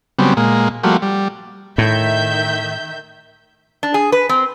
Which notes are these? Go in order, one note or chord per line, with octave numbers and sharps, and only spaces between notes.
C#3 F#3 G3 B3 C4
A#2 G#3 A#3
F3 G3 A3 A#3 F#4
G3
A2 D#3 E5 G6
D4
G#4
B4
C4